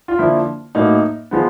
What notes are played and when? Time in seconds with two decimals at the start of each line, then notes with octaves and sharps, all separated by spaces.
0.08 F4
0.19 D3 F3 A#3 E4
0.75 A2 F#3 A#3 D#4
1.31 F3 G#3 B3